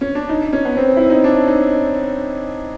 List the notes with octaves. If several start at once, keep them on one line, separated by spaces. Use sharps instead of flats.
C#4
D4
D#4
C#4
B3
C4
E4
D#4
D4
D#4